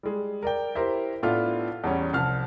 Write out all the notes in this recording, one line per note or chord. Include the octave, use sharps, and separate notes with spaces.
G3 G#3
A#4 D5 G5
E4 G4 A#4 C5
A2 B3 D4 E4 F4 F6
E2 G3 C#4
C2 F3 A5 F6